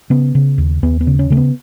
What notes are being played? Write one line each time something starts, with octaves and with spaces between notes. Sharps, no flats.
C#3 B3
C#3
D#2
D#2 B3
B3
C#3
C#4
C#3 A3
B3